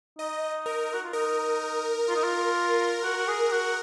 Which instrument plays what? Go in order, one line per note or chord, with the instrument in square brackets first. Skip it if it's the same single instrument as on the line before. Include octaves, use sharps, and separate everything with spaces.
[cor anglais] D#4 [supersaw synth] D#5
[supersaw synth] A#4
[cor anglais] F#4
F4
[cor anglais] D#4 [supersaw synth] A#4
[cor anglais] F4
D#4
F4
F#4
F#4
G#4
F#4